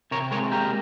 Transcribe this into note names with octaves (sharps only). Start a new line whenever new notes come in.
C3 A#4 C#5
G#3 A#4 C#5
A#3 G4 A#4